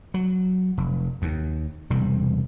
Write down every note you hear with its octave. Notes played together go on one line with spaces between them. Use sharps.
F#3
F1
D#2
E1 C3 G3